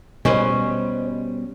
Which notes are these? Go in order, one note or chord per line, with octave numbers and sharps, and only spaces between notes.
B2 G3 C#4 B4 C5 D#5